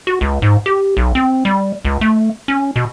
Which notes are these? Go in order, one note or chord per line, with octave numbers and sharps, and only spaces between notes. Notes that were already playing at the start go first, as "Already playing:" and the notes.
F#4
C#2
G#2
G4
B1
C4
G3
C#2
A3
C#4
B2